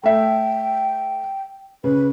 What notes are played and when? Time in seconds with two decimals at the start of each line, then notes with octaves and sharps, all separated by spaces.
0.04 A3 E5 G5
1.84 C#3 B4